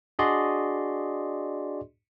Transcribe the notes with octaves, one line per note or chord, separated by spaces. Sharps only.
D4 F#4 G#4 D5 D#5 C6